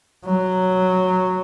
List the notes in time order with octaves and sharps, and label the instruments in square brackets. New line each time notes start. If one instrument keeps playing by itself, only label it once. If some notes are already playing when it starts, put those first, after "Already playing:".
[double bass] F#3